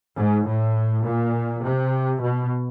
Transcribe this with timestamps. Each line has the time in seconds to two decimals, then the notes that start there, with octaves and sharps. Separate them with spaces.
0.15 G#2
0.44 A2
1.03 A#2
1.62 C3
2.20 B2